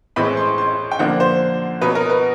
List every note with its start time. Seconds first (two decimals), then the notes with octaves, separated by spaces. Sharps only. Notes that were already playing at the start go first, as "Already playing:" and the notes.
0.16 A2 E3 G#3 C4 B5
0.37 C6
0.58 C6
0.91 G5
0.99 D3 F3 A#3 D4 F#5
1.20 C5
1.82 B2 F#3 B3 B4
1.95 A#4
2.10 B4